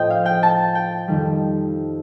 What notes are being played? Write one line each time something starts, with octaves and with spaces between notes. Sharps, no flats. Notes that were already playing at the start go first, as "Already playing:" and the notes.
Already playing: A2 F3 C5 D#5 G5
F5
G5
A5
G5
F2 D#3 G3